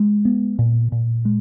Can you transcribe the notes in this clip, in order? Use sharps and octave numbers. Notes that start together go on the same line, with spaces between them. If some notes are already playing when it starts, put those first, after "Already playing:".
Already playing: G#3
B3
A#2
A#2
G#3